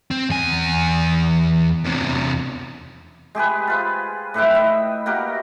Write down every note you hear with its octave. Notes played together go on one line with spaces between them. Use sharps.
C4
E2 G#5
E2 C3
G#3 G4 G#4 B4
F4 B4 C5
A2 B4 E5 G5
D#5 E5
A#3 F#4 G4 A#4